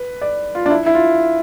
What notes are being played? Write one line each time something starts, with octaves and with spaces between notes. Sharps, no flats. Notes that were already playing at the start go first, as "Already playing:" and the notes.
Already playing: B4
D5
F4
D4
E4
E4
F4